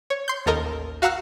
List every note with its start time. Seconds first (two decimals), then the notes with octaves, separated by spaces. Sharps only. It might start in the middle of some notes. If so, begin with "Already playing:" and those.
0.10 C#5
0.28 C6 G6
0.46 A1 D#2 A4 A#4 D#5
1.02 F#4 F5 F#5 A#5 E6 F#6